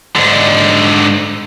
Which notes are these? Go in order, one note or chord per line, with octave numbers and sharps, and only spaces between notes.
G#2 D3